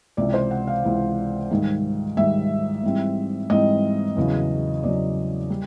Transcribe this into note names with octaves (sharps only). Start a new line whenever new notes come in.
C#2 C3 E3 D5
C5
F#5
F5
C#2 C3 E3
G#2 D#3 G3
G#2 D#3 G3 E5
G#2 E3 G3 C4
G#2 E3 G3 C4 D#5
E2 C#3 F#3
E2 C#3 F#3 D5
G3